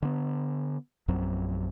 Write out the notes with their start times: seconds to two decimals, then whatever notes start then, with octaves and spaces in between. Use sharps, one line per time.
0.02 D3 B3
1.08 A#1 F#2 F#3 C4